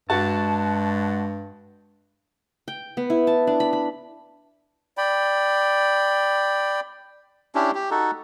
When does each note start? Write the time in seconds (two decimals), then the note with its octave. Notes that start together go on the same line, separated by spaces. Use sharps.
0.10 G2 G#3 F#4 A5
2.68 G5
2.97 B3
3.10 E4
3.27 A5
3.47 D4
3.60 B5
3.73 B5
4.97 D5 G5 B5
7.55 C#4 D4 E4 G4
7.75 G4
7.91 D#4 F#4 A4